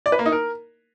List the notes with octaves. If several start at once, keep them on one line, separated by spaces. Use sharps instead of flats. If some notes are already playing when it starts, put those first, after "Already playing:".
D5
B4
A#3
D#4
A#4